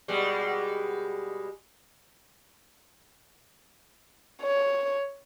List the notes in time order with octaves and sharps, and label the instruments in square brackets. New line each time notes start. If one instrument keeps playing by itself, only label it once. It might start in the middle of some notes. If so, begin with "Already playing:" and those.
[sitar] B2 G3 G#3
[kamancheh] C#5